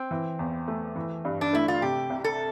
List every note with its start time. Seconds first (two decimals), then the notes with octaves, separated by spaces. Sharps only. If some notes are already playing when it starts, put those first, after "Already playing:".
Already playing: C4
0.11 E3
0.39 E2
0.68 A3
0.96 E3
1.25 G2
1.41 D4
1.53 A3 E4
1.68 F4
1.82 C3 G4
2.10 C2
2.24 A4